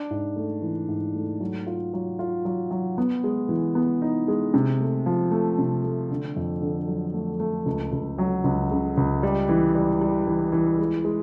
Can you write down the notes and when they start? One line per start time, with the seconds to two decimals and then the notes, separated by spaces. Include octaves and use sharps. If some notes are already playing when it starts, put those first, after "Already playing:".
Already playing: D4
0.11 G#2
0.36 A3
0.62 E3
0.88 G#2
1.15 A3
1.40 F#3
1.67 F4
1.93 F#3
2.19 F4
2.45 F#3
2.71 F#3
2.98 B3
3.24 G#3
3.49 E3
3.75 B3
4.02 D#4
4.28 G#3
4.54 C3
4.80 A3
5.06 F3
5.31 A3
5.58 C3
5.84 A3
6.11 D3
6.36 F2
6.62 D3
6.88 F#3
7.14 A3
7.40 A3
7.66 C#2
7.92 C#2
8.18 F#3
8.44 C#2
8.71 C#3
8.97 C#2
9.23 G3
9.49 E3
9.75 G3
10.01 G3
10.27 E3
10.52 E3
10.79 G#3
11.05 G#3